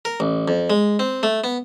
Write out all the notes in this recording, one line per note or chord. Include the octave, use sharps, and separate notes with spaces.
A#4
A1
F2
G#3
C4
A3
B3